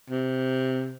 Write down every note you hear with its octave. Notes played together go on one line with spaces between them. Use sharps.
C3